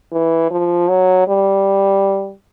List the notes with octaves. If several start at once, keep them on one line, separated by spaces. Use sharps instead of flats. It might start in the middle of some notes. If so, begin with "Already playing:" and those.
E3
F3
F#3
G3